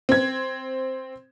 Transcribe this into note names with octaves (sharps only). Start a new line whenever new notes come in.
C4 G#6